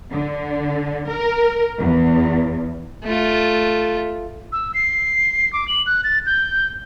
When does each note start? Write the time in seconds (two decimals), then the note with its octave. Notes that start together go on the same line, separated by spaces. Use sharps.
0.11 D3
1.09 A#4
1.79 E2
3.04 A3 F4
4.52 E6
4.74 C7
5.53 D6
5.68 F#7
5.86 F#6
6.04 A6
6.26 G6